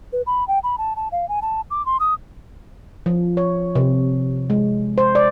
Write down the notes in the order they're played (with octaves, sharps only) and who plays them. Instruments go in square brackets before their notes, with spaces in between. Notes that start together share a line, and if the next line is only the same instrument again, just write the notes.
[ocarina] B4
B5
G5
B5
A5
A5
F5
G#5
A5
D6
C6
D#6
[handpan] F3
C#5
C3
G#3
C5
D5